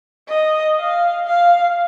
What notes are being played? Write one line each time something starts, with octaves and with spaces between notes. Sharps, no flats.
D#5
F5
F5